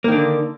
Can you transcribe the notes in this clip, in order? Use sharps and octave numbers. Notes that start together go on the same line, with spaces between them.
D3 D#3 A#3 D4